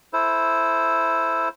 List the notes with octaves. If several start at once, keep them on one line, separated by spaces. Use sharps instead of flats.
E4 A4 C5